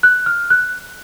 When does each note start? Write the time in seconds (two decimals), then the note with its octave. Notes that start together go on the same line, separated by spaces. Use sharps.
0.03 F#6
0.26 F6
0.50 F#6